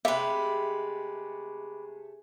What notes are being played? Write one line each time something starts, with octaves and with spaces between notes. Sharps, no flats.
C3 G#3 A3 G4 B4 E5